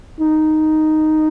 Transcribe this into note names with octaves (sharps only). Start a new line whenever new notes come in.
D#4